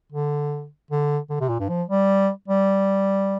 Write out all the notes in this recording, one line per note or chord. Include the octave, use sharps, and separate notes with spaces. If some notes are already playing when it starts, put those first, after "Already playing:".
D3
D3
D3
C3
A#2
G2
F3
G3
G3